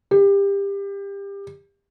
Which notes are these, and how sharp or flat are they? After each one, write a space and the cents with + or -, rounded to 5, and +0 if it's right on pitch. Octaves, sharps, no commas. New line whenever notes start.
G4 +25